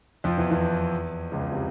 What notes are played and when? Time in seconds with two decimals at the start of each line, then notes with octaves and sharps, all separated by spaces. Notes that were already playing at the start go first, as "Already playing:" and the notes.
0.24 F2 F3
0.37 E2 E3
0.51 E2 E3
1.32 C#2 C#3
1.52 C3